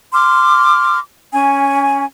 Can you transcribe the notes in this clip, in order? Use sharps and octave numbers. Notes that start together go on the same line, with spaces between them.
C6 D6 F6
C#4 G#5